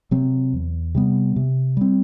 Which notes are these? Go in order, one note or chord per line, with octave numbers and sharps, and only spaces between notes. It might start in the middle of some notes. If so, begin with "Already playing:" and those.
C3 F#3 C4
E2
C3 G3 B3
C3
G3 C4